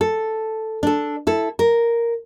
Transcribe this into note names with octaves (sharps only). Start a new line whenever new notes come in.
A4
D4 A4
E4 A4
A#4